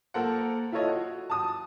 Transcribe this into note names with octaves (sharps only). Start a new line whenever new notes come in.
A#3 A4 A#4 C5 F#5
E4 F4 A4 C#5 D#5
F#4
A5 D#6